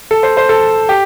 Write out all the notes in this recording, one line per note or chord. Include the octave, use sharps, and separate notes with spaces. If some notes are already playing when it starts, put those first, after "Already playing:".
A4
C5
C5
A4
G4